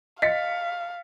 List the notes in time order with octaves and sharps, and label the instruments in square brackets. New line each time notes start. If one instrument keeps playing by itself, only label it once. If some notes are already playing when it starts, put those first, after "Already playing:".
[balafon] D#5 [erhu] F5 [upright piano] A6 B6 C#7